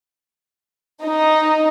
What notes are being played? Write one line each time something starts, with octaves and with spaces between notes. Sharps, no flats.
D#4